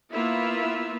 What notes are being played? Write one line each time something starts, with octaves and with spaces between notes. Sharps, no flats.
A#3 B3 E4 F4 E5